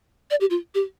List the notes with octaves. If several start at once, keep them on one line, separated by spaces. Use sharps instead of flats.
D5
G4
F4
G4